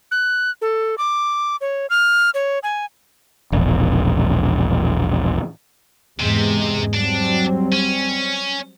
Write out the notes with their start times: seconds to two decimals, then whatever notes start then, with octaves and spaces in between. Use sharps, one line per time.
0.11 F#6
0.62 A4
0.98 D6
1.61 C#5
1.90 F6
2.34 C#5
2.63 G#5
3.52 E1 A#1
6.20 E2 G#2 C3 G#3
6.94 F#3 G3 C4 D4
7.72 C#4